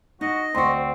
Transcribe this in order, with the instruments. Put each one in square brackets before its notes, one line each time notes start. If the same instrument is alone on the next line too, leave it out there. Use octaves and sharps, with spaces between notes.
[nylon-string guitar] D#4 [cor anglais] F#4 [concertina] D#5
[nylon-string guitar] D2 F#4 [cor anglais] C4 [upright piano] C6 C#6